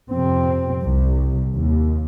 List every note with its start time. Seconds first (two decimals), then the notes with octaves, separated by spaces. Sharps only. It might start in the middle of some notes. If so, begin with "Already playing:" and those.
0.12 F2 C3 C4
0.82 C2 C3
1.53 D#2